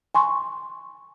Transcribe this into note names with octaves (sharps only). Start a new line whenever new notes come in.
G#5 C6 C#6